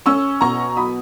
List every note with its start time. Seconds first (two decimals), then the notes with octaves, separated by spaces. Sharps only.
0.06 C#4 C#6 E6
0.41 B2 A#5 C#6
0.76 F#3 B5 D#6